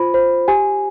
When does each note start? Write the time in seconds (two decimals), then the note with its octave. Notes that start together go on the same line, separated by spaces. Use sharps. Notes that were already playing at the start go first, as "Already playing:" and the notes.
Already playing: F4 C5 B5
0.14 C5
0.48 G4 G#5